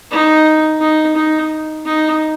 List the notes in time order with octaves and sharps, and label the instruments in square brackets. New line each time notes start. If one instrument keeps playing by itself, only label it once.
[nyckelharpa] D#4
D#4
D#4
D#4